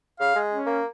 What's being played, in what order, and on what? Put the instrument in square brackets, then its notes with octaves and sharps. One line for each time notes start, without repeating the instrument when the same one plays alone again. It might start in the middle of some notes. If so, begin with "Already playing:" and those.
[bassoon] C#3 [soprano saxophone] F5
[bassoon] G#3
[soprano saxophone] C#4
[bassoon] A#3